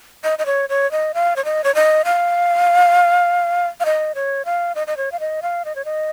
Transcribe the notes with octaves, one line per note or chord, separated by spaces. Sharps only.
D#5
D#5
C#5
C#5
D#5
F5
C#5
D#5
C#5
D#5
F5
F5
D#5
C#5
F5
D#5
D#5
C#5
F5
D#5
F5
D#5
C#5
D#5